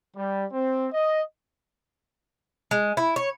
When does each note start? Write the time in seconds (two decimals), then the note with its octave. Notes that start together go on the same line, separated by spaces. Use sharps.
0.17 G3
0.52 C4
0.93 D#5
2.71 G#3
2.97 E4
3.16 C#5